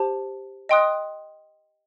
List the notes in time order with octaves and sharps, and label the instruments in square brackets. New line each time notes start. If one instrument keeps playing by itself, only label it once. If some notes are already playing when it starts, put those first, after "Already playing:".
Already playing: [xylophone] G4 C5 A5
D#5 G5 C6 D#6 F#6